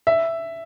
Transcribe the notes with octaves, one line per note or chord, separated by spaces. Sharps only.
E5